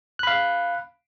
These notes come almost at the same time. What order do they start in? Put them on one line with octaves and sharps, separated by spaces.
F#6 B5 F5